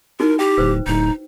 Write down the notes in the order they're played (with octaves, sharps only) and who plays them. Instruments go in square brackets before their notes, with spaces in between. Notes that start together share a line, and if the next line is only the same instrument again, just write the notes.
[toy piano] D#4 E4 F#4 [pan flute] A#4
[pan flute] G4 [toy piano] G5
[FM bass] D1 [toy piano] B4 C5
[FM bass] D1 [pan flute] D#4